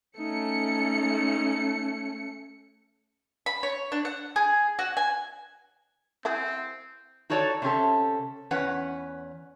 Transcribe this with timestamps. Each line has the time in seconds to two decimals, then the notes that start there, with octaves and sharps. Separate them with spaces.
0.19 A3 C#4 D#4 C#7
3.46 B5
3.63 C#5
3.92 D4
4.05 F#5
4.36 G#4
4.79 F#4
4.97 G#5
6.25 C4 E4 F#4 G#4
7.30 D#4 F#4 A4 C#5 D5
7.62 C3 C#4 G4 A4
8.51 E2 C#4 B4 C#5 F#5